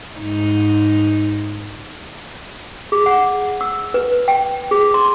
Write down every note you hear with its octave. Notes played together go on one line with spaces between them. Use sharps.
G#2 D#4
G#4
F#5
E6
B4
G5
G#4
C6